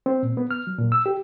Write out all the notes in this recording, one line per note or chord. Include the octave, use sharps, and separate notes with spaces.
C4
A#2
B3
F6
F#3
A#2
E6
G4